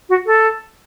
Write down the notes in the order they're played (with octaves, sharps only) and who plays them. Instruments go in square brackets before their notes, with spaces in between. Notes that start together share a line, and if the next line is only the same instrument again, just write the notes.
[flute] F#4
A4